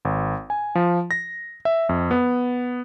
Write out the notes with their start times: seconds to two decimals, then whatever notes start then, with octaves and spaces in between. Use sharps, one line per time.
0.05 G#1
0.50 G#5
0.75 F3
1.11 A#6
1.65 E5
1.89 F2
2.11 B3